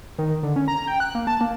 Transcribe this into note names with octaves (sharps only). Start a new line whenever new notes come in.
D#3
D3
C#4
A#5
G5
F#6
A#3
A5
A#3